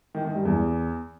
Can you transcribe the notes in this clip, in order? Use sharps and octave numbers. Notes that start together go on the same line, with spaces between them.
D#3
D#3
G2
E2